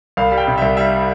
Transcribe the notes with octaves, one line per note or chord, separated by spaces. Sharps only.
C2 F5
G3
G5
C3
C2 E5
G3 E5